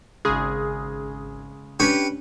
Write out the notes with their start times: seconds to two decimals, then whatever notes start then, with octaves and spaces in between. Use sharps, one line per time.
0.25 G#1 C#3 G#3 G#4
1.80 C#4 D4 G4 B4 C#6